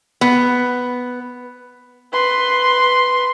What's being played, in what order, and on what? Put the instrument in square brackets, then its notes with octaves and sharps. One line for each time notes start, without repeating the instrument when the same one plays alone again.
[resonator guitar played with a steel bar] B3
[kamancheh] B4 C6